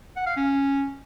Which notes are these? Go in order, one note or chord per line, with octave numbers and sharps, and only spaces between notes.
F#5
F5
C#4